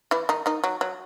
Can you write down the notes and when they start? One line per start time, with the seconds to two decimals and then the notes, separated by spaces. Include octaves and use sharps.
0.11 E3 E4
0.29 D#3 D#4
0.46 D#3 D#4
0.64 F#3
0.81 F#3